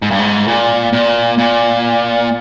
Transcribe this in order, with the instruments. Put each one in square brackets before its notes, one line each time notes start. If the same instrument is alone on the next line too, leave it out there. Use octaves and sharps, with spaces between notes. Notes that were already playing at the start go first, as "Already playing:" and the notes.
[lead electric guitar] G#2
G2
G#2
A#2
A#2
A#2